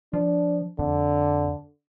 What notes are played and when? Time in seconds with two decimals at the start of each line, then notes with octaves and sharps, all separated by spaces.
0.13 F3 D4
0.79 F2 D3